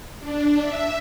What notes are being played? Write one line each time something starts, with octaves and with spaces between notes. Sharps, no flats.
D4
E5